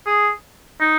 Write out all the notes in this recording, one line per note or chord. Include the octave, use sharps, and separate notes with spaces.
G#4
D#4